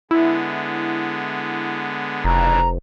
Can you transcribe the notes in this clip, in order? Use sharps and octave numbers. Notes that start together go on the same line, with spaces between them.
D3 G#3 B3 E4
F1 C#3 E3 D4 A#5